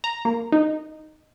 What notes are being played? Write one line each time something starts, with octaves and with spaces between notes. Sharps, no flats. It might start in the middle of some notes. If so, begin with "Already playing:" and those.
A#5
A#3
D#4